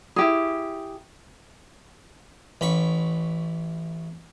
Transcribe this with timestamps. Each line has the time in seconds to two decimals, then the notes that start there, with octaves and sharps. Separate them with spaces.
0.16 E4 G4 G#4
2.61 A1 B5 C#6